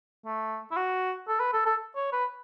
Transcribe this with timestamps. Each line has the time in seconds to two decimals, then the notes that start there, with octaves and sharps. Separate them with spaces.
0.26 A3
0.71 E4
0.77 F#4
1.28 A4
1.40 B4
1.53 A4
1.66 A4
1.96 C#5
2.13 B4